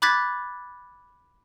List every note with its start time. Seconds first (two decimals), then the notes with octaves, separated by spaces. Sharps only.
0.02 B5 D6 F#6 G#6 A6 B6